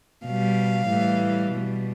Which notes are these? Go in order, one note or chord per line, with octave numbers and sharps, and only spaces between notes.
B2 G3 F5
A2 E3 G3
B2 G3